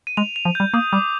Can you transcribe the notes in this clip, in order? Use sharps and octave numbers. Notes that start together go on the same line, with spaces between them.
D#7
G#3 F7
F7
F3
G3 G6
A#3 D#6
G3 D6